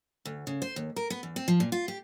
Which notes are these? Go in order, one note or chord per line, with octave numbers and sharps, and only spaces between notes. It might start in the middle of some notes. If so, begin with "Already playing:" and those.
D2
C#3
C5
D#2
A#4
B3
E2
C4
F3
A#2
F4
G4